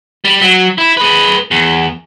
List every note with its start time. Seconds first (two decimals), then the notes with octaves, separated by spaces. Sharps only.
0.25 G3
0.41 F#3
0.78 E4
0.97 G#4 B4
1.51 E2